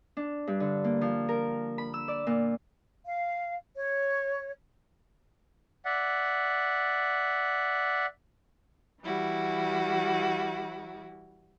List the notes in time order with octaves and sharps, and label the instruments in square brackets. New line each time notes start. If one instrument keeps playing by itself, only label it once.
[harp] D4
G2
D3
A#3
F3
A#4
B5
E6
D5
A#2
[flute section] F5
C#5
[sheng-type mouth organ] D5 E5 F#5
[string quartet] E3 G3 E4 F#4